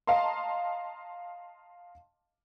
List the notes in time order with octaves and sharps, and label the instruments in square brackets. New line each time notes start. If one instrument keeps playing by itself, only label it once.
[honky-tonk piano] D#5 F5 A5 A#5 C6